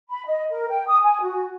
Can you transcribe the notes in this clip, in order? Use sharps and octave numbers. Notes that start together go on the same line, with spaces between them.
B5
D#5
A#4
G5
D#6
G#5
F#4